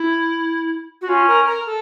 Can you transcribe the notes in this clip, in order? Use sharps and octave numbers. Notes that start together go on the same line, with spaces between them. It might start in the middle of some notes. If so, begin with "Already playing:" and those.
Already playing: E4
F#4
C#4 F4
A#4
A#4
A4